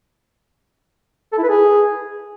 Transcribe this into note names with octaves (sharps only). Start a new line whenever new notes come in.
A4
E4
B4
G#4